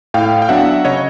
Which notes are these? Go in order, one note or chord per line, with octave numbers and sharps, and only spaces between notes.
A2 F5 G5
G5
F#3 B3 D4 E5 F#5
C#3 C#5 D#5